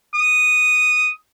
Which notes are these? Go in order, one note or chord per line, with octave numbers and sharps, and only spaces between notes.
D#6